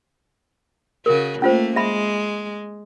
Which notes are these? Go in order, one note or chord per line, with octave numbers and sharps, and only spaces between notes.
C#3 F#4 A#4
A3 A#3 C#4 F4 C5
G#3 E5 B5